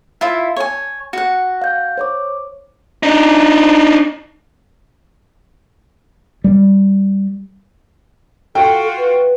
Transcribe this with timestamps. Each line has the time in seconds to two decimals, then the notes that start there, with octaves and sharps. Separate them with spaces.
0.21 E4 F4 E5
0.56 C#5 G#5
1.13 F#4 F#5
1.62 F5 G6
1.97 C5 C#5 D6
3.03 D4 D#4
6.44 G3
8.55 F4 F#4 A4 G5
8.98 B4